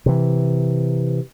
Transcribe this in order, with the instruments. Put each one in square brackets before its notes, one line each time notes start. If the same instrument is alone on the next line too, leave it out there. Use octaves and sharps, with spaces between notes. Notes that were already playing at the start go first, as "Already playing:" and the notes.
[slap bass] C3 E3